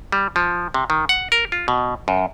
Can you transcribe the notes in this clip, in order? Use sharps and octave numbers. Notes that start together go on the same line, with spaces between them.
G3
F3
C3
D#3
F#5
A#4
F4
B2
F#2